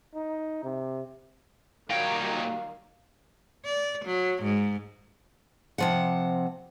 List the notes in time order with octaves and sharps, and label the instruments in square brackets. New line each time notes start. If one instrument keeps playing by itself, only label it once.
[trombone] D#4
C3
[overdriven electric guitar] A#2 G5 [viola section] D#3 F#3 G3 [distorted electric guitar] D#4 C#5 [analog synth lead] F5
[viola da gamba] D5
F#3
G#2
[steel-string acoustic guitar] C3 F3 F#5